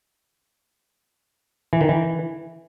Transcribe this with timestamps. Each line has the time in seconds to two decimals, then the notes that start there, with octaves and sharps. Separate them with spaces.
1.73 E3
1.81 D#3
1.89 E3